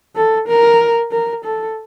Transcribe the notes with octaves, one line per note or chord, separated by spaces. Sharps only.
A4
A#4
A#4
A4